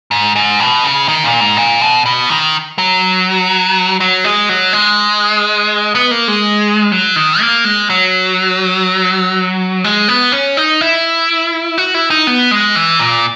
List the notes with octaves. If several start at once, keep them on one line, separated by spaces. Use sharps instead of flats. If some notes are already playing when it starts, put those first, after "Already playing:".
G#2
G#2
B2
C#3
D#3
A#2
G#2
A#2
B2
B2
D#3
F#3
F#3
G#3
F#3
G#3
B3
A#3
G#3
F#3
D#3
A#3
G#3
F#3
G#3
B3
C#4
D#4
E4
F#4
E4
D#4
B3
G#3
E3
A#2